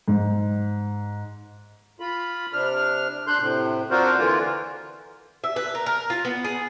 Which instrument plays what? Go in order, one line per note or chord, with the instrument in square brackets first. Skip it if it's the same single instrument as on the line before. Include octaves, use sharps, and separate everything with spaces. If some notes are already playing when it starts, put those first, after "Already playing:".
[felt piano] G#2
[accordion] F4 B5
C3 D4 F6
D4 C6 F#6 G6
A2 C3
C4 D4 F4 F#4 A#4 C5
D3 E3 A#3 F4
[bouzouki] E5
B4
A#4
A#4
F4
B3
G#4